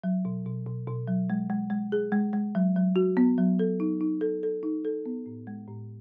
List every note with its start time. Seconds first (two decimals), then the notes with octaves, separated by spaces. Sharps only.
0.04 F#3
0.25 B2
0.46 B2
0.66 B2
0.88 B2
1.08 F#3
1.30 G#3
1.50 G#3
1.70 G#3
1.92 G#4
2.12 G#3
2.33 G#3
2.55 F#3
2.76 F#3
2.96 F#4
3.17 B3
3.38 F#3
3.59 A4
3.80 D#4
4.01 D#4
4.21 A4
4.43 A4
4.63 D#4
4.85 A4
5.06 B3
5.26 A2
5.47 G#3
5.68 A2